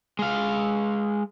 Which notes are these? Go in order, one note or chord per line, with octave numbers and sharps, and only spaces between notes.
G#3 F5